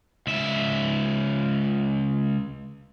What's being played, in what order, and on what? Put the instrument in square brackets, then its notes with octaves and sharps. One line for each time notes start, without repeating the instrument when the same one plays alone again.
[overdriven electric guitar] C#2 E5